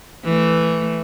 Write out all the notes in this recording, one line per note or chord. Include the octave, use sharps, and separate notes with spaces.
E3 A3